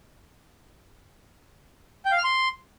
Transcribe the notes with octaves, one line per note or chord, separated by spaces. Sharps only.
G5
F5
F6
C6